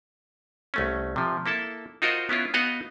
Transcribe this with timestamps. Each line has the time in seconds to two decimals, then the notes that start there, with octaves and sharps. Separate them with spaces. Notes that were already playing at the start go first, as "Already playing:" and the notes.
0.74 C2 A3 C#4
1.16 C3 F3
1.46 A#3 E4 A4 A5
2.02 D#4 F4 F#4 A#4 C5 D#5
2.29 B3 C#4 E4 F4
2.54 B3 D#4 F#4 D#5 F5 F#5